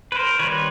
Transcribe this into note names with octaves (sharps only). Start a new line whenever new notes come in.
B4
A#4 C5
D#3 G3 C4 B4 C#5